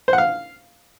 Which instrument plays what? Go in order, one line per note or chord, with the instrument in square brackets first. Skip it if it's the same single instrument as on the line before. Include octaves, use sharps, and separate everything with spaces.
[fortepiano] C5
F#5
F5